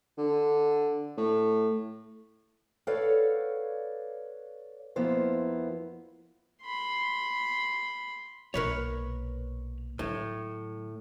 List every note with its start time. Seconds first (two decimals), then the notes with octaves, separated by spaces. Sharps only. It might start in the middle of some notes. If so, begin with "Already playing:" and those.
0.18 D3
1.18 A2
2.87 A4 B4 C#5 D5 F5 F#5
4.96 F2 F3 A#3 B3 E4 C5
6.63 B5 C6
8.54 B1 A#2 A#4 B4 C#5
9.99 A2 D3 F#3